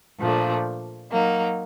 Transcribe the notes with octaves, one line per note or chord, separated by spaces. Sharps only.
A#2 F3 A3 D4
F#3 A#3 D#4